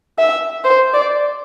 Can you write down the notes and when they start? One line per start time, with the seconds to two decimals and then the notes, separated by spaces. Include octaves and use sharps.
0.19 E5
0.65 C5
0.94 D5